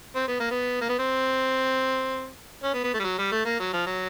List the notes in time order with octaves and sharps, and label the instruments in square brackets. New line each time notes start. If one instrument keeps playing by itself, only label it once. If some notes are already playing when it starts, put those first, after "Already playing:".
[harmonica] C4
B3
A#3
B3
A#3
B3
C4
C#4
B3
B3
A3
G3
F#3
G3
A3
A#3
F#3
F3
F#3